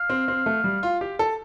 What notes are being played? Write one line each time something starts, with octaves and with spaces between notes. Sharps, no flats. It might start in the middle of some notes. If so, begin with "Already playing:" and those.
Already playing: F5
C4
C4
A3
G3
F4
G4
A4